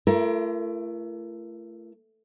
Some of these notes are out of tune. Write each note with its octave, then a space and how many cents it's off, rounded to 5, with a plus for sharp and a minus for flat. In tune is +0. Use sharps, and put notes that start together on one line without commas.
A3 +10 F4 -45 A#4 +25